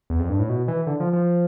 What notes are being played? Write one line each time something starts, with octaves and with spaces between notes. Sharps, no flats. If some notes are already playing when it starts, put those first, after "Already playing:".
E2
F2
G2
A2
B2
E3
D3
F3
F3